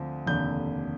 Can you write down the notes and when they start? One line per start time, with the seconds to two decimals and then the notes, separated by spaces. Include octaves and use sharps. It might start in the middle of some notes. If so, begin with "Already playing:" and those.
Already playing: D2 F3 C4
0.26 F1 D#2 D3 G6